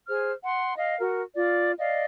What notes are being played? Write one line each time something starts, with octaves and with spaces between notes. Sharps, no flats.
G#4 C5 F6
F#5 C6
D#5 F5
F#4 A#4
F4 D5
D5 D#5 F5